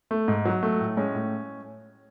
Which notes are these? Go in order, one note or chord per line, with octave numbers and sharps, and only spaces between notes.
A3
G#2
F#3
A3
A2
G#3 C#4
A2